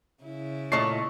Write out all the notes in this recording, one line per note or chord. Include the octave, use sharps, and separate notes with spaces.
C#3 E4
A#2 A3 C#5 D#5 C#6 C7